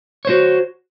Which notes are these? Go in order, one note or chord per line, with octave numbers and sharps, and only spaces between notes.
F#4 C5 C#5